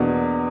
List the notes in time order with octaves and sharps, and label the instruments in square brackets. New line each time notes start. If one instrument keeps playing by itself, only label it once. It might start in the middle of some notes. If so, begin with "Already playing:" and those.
Already playing: [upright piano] E2 B2 A#3 [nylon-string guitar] D4 F#4